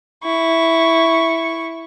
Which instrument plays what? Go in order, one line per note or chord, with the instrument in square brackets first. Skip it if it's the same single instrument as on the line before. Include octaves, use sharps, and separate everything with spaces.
[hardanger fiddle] E4 C#6